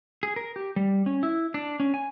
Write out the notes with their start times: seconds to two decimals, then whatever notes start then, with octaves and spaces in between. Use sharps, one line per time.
0.23 G#4
0.36 A#4
0.56 G4
0.76 G3
1.06 C#4
1.23 E4
1.54 D4
1.80 C#4
1.94 G#5